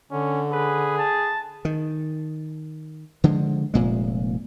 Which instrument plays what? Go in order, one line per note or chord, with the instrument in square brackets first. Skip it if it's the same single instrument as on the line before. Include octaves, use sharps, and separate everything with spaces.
[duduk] D3 [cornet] C#4
[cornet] G#4 [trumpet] B4
[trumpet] A5
[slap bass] D#3
D3 F3 G#3
F1 A#2 G#3